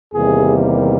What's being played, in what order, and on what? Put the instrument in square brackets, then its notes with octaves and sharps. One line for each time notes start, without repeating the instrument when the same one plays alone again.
[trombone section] E2 C3 D#3 G3 A#3 G#4